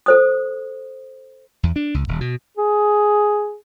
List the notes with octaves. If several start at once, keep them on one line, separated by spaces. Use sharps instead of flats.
A4 C5 D#6
E2
D4
C#2
D#1
B2
G#4